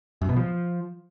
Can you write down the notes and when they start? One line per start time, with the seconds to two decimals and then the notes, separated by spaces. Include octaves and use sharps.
0.22 F#2
0.29 B2
0.36 F3